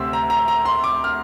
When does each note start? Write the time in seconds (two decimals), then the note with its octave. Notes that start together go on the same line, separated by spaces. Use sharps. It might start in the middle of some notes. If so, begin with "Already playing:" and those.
Already playing: D2 C3 C4 E6
0.13 A#5
0.30 A#5
0.48 A#5
0.65 C6
0.84 D6
1.04 F6